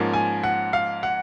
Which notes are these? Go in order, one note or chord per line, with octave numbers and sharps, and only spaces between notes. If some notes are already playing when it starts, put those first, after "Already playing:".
Already playing: G#2 F3 A#3 C#4
G#5
F#5
F5
F#5